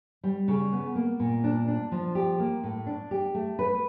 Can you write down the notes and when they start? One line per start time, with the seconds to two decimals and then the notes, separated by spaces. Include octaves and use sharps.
0.24 G3
0.48 C#3
0.72 B3
0.95 A#3
1.20 A#2
1.44 D4
1.68 D4
1.92 F3
2.15 G4
2.39 A#3
2.63 A2
2.86 D4
3.11 G4
3.34 A3
3.59 B4